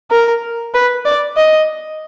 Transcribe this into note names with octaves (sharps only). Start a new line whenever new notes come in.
A#4
B4
D5
D#5